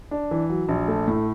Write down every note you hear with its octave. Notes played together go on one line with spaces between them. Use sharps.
D4
E3
F#3
A#1
A3
A2